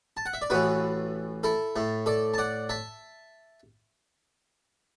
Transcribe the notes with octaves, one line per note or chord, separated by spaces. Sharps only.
A5
F#5
E5
D5
A1 A2 E3 F#4 B4
E4 A4
A2 A3
A4 D5
A5
D5 F#5
E5 A5